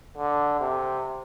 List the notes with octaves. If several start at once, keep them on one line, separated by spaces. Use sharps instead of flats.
D3
C3